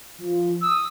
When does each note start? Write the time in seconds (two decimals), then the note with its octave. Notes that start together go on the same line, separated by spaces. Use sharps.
0.18 F3
0.61 D#6 E6